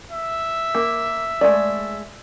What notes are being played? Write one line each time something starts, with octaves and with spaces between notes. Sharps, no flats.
E5
A#3
G#3 A3 D5